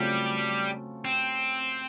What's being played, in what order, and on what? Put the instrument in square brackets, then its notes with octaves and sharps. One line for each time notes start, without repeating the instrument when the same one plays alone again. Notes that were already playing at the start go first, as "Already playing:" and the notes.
Already playing: [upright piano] C#3 F#3 A3 C4 F4 [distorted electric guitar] G3
[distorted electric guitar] C4